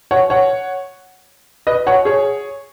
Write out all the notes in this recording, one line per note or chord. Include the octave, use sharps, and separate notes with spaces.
C#5 F#5
C#5 F#5
B4 D#5
C#5 F#5
G#4 C#5